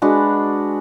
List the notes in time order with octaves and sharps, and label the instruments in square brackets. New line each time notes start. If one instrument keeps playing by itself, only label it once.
[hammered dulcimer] G#3 D4 F#4 B4